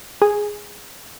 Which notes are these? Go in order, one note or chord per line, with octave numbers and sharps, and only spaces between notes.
G#4